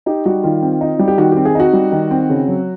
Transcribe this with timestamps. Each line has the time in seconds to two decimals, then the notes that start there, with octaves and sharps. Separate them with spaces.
0.06 D#4 G4
0.25 G3 F#4
0.43 D#3 F4
0.62 C4
0.81 D#4
0.99 G3
1.08 G4
1.18 D#3 F#4
1.32 C4 G4
1.45 G#4
1.55 D#4 F#4
1.73 G3
1.92 D#3
2.11 C4
2.30 C#3
2.48 F#3